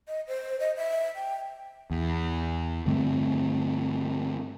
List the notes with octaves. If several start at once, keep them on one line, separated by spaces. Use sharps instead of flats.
D#5
C5
D#5
E5
G5
E2
G2 D3 A3 C4